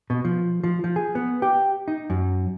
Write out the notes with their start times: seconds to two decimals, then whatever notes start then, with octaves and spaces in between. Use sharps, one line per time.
0.10 B2
0.25 F3
0.64 F3
0.84 F3
0.96 G#4
1.15 B3
1.42 G4
1.88 D#4
2.10 F#2